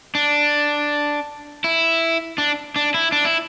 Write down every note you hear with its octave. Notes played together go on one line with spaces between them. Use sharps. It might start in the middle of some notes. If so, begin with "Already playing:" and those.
D4
E4
D4
D4
E4
D4
E4